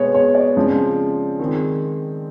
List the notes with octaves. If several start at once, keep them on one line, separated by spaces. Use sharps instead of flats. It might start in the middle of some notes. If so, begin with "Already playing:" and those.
Already playing: B2 G#3 B3 C#5
C#5
D5
C#3 F3 G#3 C4
D#3 G#3 C4